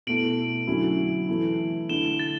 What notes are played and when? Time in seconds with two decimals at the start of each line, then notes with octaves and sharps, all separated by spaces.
0.07 B2 A3 E4 D7 F#7
0.67 D3 F#3 C#4 E4
1.28 E3 A3 E4
1.89 D3 A3 E4 E7 G7
2.19 A6